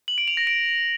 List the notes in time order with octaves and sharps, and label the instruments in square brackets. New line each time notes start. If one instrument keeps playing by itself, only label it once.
[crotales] F#7
D7
F7
A#6
D7